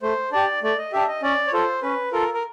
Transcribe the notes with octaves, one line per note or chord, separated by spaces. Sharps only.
A3 C5
D4 G4 D5
A3 D5
D#5
D4 G4 E5
D#5
C#4 D5
C#5
F4 A4 C5
C#4 B4
F4 A4 A#4
A#4